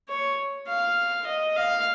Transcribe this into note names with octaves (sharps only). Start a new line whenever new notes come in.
C#5
F5
D#5
F5